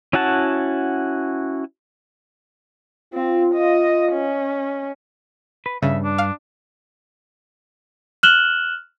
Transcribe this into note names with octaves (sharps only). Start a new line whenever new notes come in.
C#4 E4 F#4 F#5 A5
C4 F4
D#5
C#4
B4
G2 C#3 E5
D4
F5
F6 F#6 E7 F#7 G7